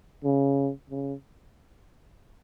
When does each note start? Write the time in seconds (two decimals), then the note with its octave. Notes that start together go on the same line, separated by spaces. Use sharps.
0.24 C#3
0.90 C#3